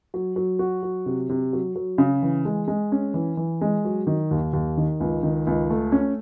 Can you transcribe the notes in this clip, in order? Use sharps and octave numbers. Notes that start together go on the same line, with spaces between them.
F#3
F#3
F#4
F#3
C3
C3
F#3
F#3
C#3
E3
G#3
G#3
C#4
E3
E3
G#3
F#3
D#3
D#2
D#2
D#3
C#2
D#3
C#2
A3
C#4